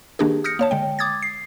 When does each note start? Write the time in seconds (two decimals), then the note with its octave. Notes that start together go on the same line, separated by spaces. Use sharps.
0.19 D#3 A#3 D4 G4 G#4
0.44 D#6 F6 G6 A#6 C#7
0.59 A#3 C#5 A5
0.71 D3 G#3 G5
0.99 D6 D#6 G#6 A6
1.22 C7